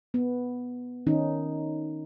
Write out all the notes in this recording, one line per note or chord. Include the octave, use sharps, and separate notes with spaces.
B3
D#3 C#4 D#4